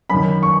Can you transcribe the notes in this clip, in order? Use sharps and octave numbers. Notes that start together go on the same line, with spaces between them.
F#2 D#3 B5
C#6